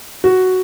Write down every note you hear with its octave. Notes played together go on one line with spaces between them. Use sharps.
F#4